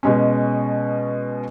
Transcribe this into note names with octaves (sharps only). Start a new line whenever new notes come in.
B2 G#3 C#4